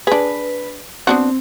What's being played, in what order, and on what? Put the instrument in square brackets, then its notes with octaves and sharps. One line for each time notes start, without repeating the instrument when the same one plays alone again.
[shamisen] D4 G#4 [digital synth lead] B4
[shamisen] B3 D4 F#4 [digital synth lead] C4